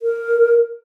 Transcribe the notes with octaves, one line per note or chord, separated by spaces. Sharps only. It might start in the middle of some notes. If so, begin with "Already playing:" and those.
A#4